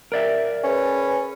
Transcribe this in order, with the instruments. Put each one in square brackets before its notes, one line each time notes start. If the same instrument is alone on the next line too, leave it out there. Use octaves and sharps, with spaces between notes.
[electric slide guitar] A#4 D5 E5
[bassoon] C#4 [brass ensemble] G#4 B4